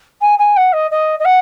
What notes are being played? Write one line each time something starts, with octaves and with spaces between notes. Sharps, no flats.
G#5
G#5
F#5
D#5
D#5
D#5
F#5